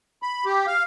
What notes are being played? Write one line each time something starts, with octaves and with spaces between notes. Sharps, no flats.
B5
G4
F5